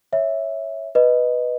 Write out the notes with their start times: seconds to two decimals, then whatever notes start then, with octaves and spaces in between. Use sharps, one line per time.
0.13 C#5 E5
0.95 B4 D#5